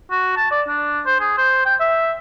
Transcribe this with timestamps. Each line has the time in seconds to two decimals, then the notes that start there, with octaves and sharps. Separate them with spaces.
0.11 F#4
0.37 A5
0.51 D5
0.68 D4
1.06 C5
1.20 G#4
1.38 C5
1.66 G5
1.81 E5